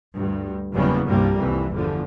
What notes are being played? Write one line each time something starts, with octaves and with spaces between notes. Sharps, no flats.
D2 G2
F#1 E2 C#3 G3 A#3 B3
C2 G2 F3 G3 A#3
C2 F2 E3
G1 E2 D3 F3